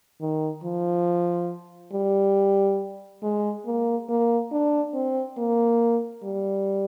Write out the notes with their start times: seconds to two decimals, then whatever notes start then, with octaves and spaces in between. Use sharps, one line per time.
0.21 D#3
0.64 F3
1.93 G3
3.22 G#3
3.66 A#3
4.09 A#3
4.51 D4
4.94 C4
5.38 A#3
6.24 G3